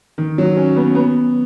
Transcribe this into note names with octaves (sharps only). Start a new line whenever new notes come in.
D#3
F#3
C#4
B3
B3